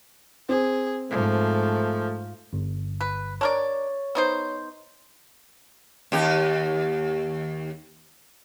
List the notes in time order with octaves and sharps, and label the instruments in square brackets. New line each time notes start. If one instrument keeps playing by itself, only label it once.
[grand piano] C4 [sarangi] G#4
[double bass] G#2 [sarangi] F3 [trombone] A3
[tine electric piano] G1
[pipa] B4
[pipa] D4 A#4 D5 [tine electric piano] C#5
[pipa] B3 D#4 C5
[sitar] D#2 G4